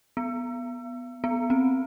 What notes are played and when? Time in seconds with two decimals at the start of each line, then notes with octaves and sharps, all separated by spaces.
0.17 B3
1.24 B3
1.50 C4